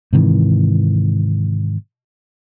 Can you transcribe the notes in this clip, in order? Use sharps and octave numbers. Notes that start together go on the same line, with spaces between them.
G#2 C3 D#3 E3